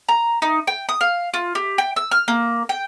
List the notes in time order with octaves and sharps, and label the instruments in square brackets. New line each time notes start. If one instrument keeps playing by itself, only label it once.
[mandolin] A#5
D#4
G5
D#6
F5
F4
G4
G5
E6
F6
A#3
G5